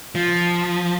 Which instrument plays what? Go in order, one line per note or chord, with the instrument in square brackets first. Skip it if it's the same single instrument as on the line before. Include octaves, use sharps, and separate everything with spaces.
[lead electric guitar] F3